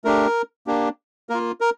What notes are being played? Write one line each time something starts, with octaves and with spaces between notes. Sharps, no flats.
A3 D4 G4 A#4
A#3 D4 G4
A#3 F4 A#4
A#4